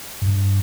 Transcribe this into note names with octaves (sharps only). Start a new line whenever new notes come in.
G2